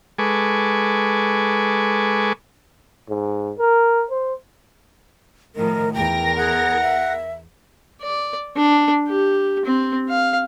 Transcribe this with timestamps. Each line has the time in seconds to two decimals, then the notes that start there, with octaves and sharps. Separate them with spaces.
0.18 G#3 A4 B4 G#5 C#6 D6
3.09 G#2
3.58 A#4
4.10 C5
5.56 A2 D#3 F3 A#4
5.94 E2 A#4 G5 A#6
6.38 G#4 F#5
6.81 E5
8.02 D5
8.56 D4
9.08 G4
9.65 C4
10.09 F5